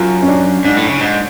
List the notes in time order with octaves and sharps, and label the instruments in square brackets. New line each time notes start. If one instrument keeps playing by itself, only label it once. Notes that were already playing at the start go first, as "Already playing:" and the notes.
Already playing: [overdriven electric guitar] F#2 [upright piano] F4
[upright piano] C#4
D4
[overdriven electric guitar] G#2 [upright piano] D4
[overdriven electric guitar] A2
C#3
G#2